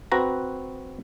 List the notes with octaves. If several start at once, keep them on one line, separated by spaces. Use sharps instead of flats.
C4 F#4 B4 A#5